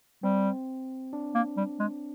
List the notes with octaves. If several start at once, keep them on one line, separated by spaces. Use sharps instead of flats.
G3 C4
D4
A#3
G3
G#3